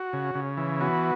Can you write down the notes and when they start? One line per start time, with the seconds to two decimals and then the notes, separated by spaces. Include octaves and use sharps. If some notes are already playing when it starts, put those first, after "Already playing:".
Already playing: F#4
0.13 C#3
0.35 C#3
0.57 E3
0.81 B3 F#4